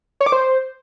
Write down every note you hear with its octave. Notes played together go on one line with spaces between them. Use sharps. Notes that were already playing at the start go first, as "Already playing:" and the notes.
C#5
D6
C5